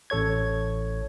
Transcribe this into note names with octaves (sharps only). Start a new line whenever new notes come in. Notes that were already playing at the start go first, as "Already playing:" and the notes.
A1 A4 C#5 G#6